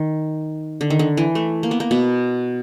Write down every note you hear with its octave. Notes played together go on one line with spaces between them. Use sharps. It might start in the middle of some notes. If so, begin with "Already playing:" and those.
Already playing: D#3
D3
D#3
D3
E3
A3
A#3
B3
A#3
B2 B3